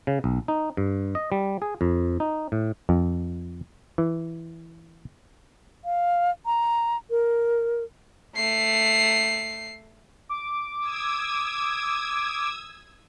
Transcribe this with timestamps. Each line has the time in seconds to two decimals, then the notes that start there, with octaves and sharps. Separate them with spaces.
0.07 C#3
0.24 B1
0.48 D#4
0.77 G2
1.15 D#5
1.32 G3
1.62 G#4
1.81 F2
2.20 D#4
2.52 A2
2.89 F2
3.98 E3
5.85 F5
6.46 A#5
7.10 A#4
8.37 A3 C7
10.29 D6
10.80 D#6 E6 G#6